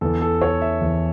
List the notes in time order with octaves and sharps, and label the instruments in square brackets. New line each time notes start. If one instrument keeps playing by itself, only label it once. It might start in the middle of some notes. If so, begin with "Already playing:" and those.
[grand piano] E2 E3 A4
A4
C#5
E5
E2 E3